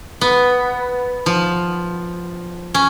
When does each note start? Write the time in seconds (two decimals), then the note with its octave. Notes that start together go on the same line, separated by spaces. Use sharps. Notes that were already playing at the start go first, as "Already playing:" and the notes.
0.21 B3
1.26 F3
2.74 C#4